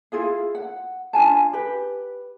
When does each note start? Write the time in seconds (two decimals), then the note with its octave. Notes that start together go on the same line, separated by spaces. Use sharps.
0.12 E4 F4 G#4 F5
0.55 F#5
1.13 D4 F4 G#5 A5
1.53 G4 B4